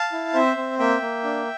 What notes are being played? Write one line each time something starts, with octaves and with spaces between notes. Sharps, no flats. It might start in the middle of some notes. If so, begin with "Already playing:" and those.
Already playing: F5 A5
E4
C4 C5 E5
C4
A#3 E5 G5
A#3
D4